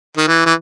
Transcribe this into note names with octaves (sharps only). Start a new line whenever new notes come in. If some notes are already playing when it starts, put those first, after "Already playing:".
D#3
E3
E3